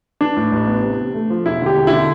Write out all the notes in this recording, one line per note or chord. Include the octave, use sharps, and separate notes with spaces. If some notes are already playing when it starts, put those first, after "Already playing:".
E3 D4
A2
A1
B3
C3
C3
A3
F3
E1 E4
D3 G4
E1
E4
D3